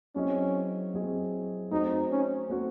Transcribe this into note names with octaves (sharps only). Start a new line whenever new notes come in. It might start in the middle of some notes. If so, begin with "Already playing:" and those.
F#3 C4 C#4 E4 G#4 D#5
F#3 C4 E4 G#4 D#5
A3 C4 D#4 F#4 C5
C#4
A3 C4 F#4 C5